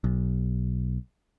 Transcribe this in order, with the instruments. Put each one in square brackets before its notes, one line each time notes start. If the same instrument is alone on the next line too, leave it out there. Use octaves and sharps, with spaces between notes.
[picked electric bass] B1